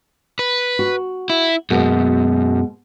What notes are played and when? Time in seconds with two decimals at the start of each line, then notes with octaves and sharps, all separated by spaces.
0.39 B4
0.79 F#4
1.30 E4
1.70 F#2 B2 G#3 A#3